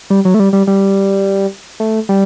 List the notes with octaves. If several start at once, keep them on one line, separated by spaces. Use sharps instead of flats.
G3
F#3
A3
G3
G3
G3
A3
G3